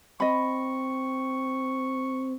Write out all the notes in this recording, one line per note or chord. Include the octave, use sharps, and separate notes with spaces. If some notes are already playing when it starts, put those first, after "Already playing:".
C4 D#5 B5 C#6